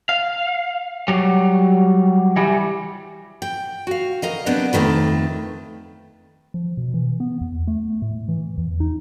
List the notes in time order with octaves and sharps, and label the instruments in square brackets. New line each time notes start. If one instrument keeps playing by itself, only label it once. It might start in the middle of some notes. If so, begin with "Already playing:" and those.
[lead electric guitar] F5
F#3 G3
E3 G3
[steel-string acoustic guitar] G5
F#4 F5
A#4 D#5 F5
C3 F#3 B3 D4
F2 G#2 D#3 A3 B4
[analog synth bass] F3
B2
E3
B3
E2
A3
A2
E3
E2
D#4